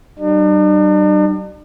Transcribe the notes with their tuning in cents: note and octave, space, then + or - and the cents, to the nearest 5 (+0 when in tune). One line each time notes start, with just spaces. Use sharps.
G3 -40 D4 +45